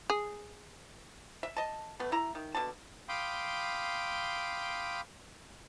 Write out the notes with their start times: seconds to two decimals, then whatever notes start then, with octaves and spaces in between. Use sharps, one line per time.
0.10 G#4
1.43 E5
1.57 D#5 A5
2.00 A3 B3
2.12 E4 A#5
2.35 D#3
2.55 B2 D3 A5
3.09 F5 G5 B5 C6 D6 D#6